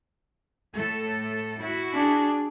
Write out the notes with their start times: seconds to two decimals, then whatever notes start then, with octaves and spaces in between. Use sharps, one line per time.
0.75 A2 A3 A4
1.60 E4 F#4
1.94 D4 G#4